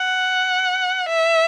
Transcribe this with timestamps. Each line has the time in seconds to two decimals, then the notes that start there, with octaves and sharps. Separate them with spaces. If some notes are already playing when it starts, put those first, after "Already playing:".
Already playing: F#5
1.08 E5